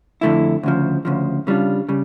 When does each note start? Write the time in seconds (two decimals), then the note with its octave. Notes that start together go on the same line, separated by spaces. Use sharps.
0.21 F2 D3 A3 E4
0.63 D2 C#3 F3
1.05 D2 C#3 F3
1.47 C#3 G3 D4 F4
1.89 C#3 G3